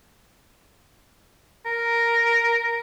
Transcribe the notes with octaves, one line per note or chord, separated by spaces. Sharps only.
A#4